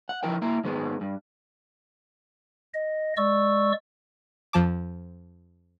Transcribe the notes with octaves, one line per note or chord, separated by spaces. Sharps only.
F#5
F3 E4 A#4 G5
A#3 E4 A#4
G#2 D#3 G#3 B3
G2
D#5
G#3 D5 C#6 E6
F2 F3 A5 D6